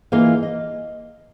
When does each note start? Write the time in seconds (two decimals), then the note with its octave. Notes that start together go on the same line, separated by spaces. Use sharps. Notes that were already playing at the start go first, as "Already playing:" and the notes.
0.12 E3 A#3 F4 G#4 D#5 F5
0.43 D#5